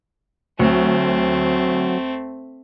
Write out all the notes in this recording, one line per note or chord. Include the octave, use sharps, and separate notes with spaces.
D2 F#3 A3 C4